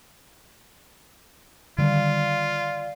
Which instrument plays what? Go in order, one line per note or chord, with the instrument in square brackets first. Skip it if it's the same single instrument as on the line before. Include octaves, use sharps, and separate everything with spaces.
[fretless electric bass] D3 D#3 G3 [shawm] F4 [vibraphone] D5 F5